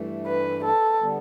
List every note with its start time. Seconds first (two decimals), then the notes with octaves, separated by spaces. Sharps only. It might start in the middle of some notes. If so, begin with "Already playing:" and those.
Already playing: G2 E3 A3
0.27 B4
0.64 A4
1.01 D3 G3 B3